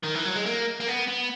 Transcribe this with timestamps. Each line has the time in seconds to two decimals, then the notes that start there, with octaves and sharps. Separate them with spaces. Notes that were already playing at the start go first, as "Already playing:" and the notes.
0.04 D#3
0.15 E3
0.25 F#3
0.36 G#3
0.46 A#3
0.80 A#3
0.87 B3
1.07 B3